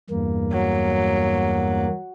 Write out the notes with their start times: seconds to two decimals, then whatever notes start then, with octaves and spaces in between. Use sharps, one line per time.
0.10 E2 G2 A#3
0.53 F#3